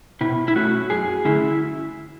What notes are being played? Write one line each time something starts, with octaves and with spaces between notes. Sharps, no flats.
B2 E4
E4
A3 C#4 F#4
F#2 G#4
D3 A3 C#4 E4